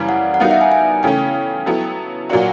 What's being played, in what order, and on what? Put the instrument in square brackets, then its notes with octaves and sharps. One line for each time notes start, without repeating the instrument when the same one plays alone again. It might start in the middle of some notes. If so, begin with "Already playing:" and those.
Already playing: [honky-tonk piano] F#2 C#3 E3 G3 A#3
[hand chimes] F#5
F#5
[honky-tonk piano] G3 B3 D#4 F#4 A#4 [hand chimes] F5
[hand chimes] E5
G#5
G#5
[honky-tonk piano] C#3 E3 A3 C#4 [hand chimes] G5
[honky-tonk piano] F#3 B3 E4 A4
[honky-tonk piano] A#2 F#3 A#3 D4 F#4 [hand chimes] F#5